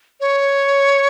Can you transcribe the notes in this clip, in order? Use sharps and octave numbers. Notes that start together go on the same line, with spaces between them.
C#5